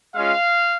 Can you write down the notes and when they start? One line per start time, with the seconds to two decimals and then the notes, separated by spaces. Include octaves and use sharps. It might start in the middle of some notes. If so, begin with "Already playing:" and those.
0.16 G#3 C#4 F4 F5